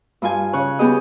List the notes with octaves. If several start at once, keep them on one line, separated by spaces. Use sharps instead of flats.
G2 F4 G#5
C#3 C#5 F#6
B3 G4 G#4 D#5